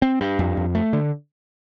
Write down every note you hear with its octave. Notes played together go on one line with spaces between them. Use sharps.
C4
G2
F2
F2
A3
D3